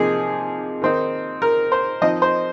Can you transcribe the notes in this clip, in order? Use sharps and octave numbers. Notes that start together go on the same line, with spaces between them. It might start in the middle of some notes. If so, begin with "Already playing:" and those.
Already playing: C3 F3 A#3 D#4 G#4
D#3 C4 D#4
A#4
C5
F3 C4 D#4 D#5
C5